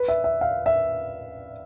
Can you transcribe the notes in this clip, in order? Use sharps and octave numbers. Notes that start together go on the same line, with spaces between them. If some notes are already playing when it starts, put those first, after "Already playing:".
Already playing: B4
E5
E5
F5
E5